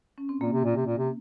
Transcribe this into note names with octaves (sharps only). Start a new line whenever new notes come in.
C#4
C4
A#2 A#3
C3
A#2
C3
A#2
C3